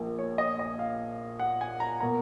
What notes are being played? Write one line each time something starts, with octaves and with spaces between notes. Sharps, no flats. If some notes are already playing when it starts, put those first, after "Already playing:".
Already playing: A#1 A#2 F3 A#3
C#5
D#5
D#5
F5
F#5
G#5
A#5
B2 A#3 A#5